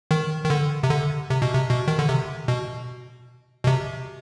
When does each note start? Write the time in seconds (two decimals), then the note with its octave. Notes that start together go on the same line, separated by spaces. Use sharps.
0.11 D#3
0.44 D#3
0.50 D3
0.83 C3
0.91 D3
1.30 C3
1.42 B2
1.55 C3
1.70 B2
1.88 D#3
1.99 D3
2.09 C3
2.48 B2
3.63 B2
3.67 C3